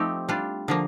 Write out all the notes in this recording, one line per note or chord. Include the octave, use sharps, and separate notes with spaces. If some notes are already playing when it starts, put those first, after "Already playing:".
Already playing: F3 A3 C4 D#4 G4
G3 D4 F4
D3 F3 A#3